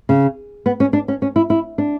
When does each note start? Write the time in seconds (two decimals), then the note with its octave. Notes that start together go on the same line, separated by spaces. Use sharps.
0.09 C#3
0.66 B3
0.80 C#4
0.93 D4
1.08 C#4
1.22 C#4
1.36 E4
1.50 E4
1.78 D4